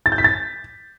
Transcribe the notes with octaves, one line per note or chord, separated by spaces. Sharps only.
A6
G6
B6
A6